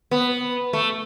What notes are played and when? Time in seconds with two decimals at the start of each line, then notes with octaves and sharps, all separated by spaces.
0.11 B3
0.73 A3